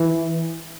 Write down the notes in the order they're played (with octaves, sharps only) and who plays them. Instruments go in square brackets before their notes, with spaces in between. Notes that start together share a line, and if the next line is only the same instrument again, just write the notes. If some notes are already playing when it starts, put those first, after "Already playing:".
Already playing: [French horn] E3